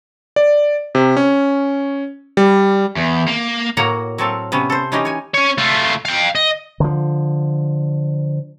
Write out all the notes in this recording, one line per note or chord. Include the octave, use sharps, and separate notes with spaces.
D5
C3
C#4
G3
E2
A#3
A2 A#3 F#4 C#5 F#5 A#5
F#3 C4 A4 F5
C3 B3 C#4
A4 C5
E3 C#4 D#4 G4 D#5
C#5 G#5
C#4 C#5
A3 F4
F5 G5
D#5
D3 F3